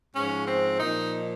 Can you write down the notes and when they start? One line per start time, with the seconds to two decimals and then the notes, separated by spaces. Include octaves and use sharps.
0.15 G#2 F3 C#4
0.47 C4
0.80 A#2 F3 D#4